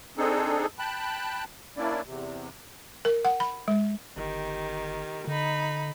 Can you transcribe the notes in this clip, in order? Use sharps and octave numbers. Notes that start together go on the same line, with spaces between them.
C4 D4 D#4 G#4 A4
G5 A5 B5 F#6
A#3 C#4 D4 E4 D5
E2 C3
A#4
F#5
B5
G#3
G1 D#3 G4
D3 D#4 B5